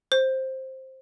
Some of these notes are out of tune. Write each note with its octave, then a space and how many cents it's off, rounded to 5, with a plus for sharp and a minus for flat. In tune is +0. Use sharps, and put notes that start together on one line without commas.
C5 +10